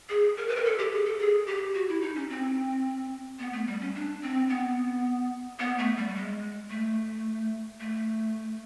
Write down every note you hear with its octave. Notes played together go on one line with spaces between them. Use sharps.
G#4
A#4
B4
A#4
A4
G4
G#4
A4
G#4
G4
F#4
E4
D#4
C#4
C4
B3
A3
G3
C#4
D4
C4
B3
B3
A3
G3
G3
G#3
A3
A3